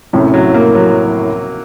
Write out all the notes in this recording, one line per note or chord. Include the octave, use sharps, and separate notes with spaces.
F#2 A2 C3
F#3
A#3
F#3